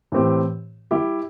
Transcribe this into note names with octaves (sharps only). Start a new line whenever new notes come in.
A2 E3 C4 G4
G3 E4 G4